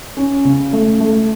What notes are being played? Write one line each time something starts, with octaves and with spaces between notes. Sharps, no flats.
C#4
C#3
A3
A3